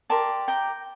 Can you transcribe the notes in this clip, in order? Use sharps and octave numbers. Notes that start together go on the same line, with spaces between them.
G4 A#4 D5 A5 C6
G5 A#5